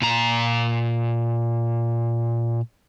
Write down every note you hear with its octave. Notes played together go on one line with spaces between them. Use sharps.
A#2 A#5